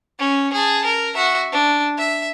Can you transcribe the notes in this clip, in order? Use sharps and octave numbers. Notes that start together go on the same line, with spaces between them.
C#4
G#4 A5
A#4
F#4 E5
D4
E5